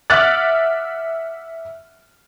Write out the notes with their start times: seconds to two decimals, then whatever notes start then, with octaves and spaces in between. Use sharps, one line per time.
0.10 E5 F#5 D6 F6 F#6 A6